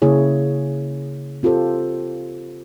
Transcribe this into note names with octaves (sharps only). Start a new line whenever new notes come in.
C#3 A#3 E4 G#4 C#5
C4 F4 G4 A4 C5